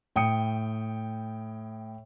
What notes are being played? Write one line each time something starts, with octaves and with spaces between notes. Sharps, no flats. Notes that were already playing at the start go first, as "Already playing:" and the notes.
A2 G5 D#6 C#7